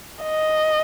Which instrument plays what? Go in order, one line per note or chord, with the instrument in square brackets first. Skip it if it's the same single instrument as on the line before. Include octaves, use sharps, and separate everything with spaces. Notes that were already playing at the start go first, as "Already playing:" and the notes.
[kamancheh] D#5